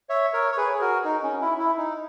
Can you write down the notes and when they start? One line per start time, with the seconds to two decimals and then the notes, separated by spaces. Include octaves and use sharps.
0.09 C#5 E5
0.33 A#4 C#5
0.52 C#5
0.57 G#4 B4
0.73 G#4
0.81 F#4 A#4
1.05 D#4
1.23 C#4
1.41 E4
1.59 E4
1.77 D#4